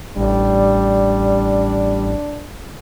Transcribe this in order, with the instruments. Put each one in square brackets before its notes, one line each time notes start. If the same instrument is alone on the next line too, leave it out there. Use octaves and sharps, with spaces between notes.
[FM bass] A1 [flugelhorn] G3 [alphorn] D4